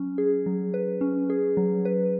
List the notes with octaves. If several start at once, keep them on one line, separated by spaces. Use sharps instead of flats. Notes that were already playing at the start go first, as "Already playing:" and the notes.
Already playing: F#3 C#4
G#4
F#3
B4
C#4
G#4
F#3
B4